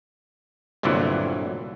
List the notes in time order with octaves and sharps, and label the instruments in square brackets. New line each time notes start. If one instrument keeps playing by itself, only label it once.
[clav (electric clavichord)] G1 C2 A#2 D3 E3 F#3